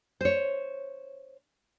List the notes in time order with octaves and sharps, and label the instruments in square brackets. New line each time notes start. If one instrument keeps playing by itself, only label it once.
[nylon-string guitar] C5 C#5